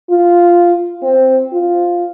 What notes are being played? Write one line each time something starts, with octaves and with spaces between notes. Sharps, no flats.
F4
C4
F4